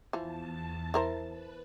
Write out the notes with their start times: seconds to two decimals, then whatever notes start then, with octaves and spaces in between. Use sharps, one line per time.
0.13 E2 E3 F3 A5
0.94 E4 A#4 C5
1.27 B4